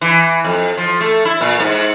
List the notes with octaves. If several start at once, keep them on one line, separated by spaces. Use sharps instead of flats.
E3
F2
F3
A3
E4
A#2
G#2